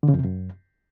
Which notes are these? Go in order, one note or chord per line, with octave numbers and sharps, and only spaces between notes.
D3
C#3
F2
C3
F#2